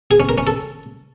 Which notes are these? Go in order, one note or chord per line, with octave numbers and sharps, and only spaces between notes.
G#4
C#4
A#4
C#4
A4